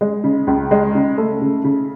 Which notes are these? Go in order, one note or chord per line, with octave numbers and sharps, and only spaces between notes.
G#3
C#3
C#2
G#3
C#3
A3
C#3
C#3